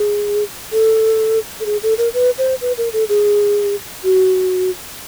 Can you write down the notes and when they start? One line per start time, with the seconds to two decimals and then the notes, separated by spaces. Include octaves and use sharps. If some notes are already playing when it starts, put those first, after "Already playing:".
Already playing: G#4
0.73 A4
1.60 A4
1.66 G#4
1.83 A4
1.98 A#4
2.14 B4
2.38 C5
2.61 B4
2.78 A#4
2.93 A4
3.09 G#4
4.04 F#4